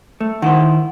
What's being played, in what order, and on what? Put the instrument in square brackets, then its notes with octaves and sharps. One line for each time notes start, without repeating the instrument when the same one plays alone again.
[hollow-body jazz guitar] A3
[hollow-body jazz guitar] D#3 E4 C5 [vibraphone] F#5